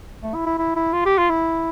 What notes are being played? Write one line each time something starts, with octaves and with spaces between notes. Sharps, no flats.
A3
E4
E4
E4
E4
F4
G4
F4
E4